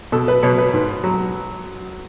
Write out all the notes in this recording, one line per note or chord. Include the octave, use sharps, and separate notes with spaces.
B2 A4
B4
B2 C#5
B4
G#2
F#3